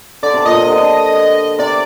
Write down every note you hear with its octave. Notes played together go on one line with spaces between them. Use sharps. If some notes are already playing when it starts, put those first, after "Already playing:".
D3 D5
C3
A#2 D#5
C3
D3
C3 D5